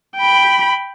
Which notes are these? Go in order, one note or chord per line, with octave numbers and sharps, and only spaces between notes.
G5 B5